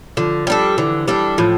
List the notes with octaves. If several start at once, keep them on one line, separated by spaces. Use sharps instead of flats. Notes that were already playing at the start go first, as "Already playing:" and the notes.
D3 F3
G3 D4 A4
D3 E3
G3 D4 A4
A2 F3